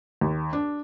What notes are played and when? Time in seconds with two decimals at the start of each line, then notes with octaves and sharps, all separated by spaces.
0.21 D#2
0.53 D4